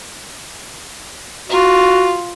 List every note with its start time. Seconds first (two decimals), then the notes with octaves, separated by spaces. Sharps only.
1.49 F4 F#4